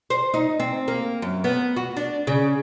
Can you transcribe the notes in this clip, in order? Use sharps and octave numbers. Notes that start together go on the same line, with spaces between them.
C5
D#4
C4
A#3
F#2
B3
F#4
D4
C#3